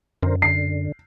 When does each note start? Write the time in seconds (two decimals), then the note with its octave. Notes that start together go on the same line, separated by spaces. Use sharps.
0.23 F#2 D3 A#4 C5
0.42 D3 C7